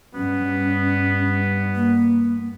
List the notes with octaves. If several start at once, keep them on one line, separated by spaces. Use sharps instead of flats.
G2 B3 C#4
A#3